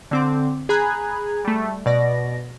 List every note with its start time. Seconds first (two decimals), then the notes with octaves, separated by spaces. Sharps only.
0.11 D3 C4 D6
0.69 G#4 G#5 A#5 B5 F#6 G#6
1.44 G3 A3
1.86 B2 D5 A#6